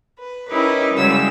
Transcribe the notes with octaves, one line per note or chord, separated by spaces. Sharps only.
B4
C#4 D#4 E4 G4 A#4 B4
F#2 C#3 G3 G#3 E6